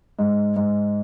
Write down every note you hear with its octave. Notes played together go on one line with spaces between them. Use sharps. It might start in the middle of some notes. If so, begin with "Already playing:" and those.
G#2
G#2